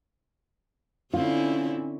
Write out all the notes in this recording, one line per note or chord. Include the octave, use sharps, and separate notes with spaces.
D3 C4 C#4 E4 F4